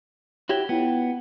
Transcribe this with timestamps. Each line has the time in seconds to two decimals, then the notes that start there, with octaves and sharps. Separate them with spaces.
0.49 E4 F#4 G4 C#5 G#6 G7
0.69 B3 E4 F4 G5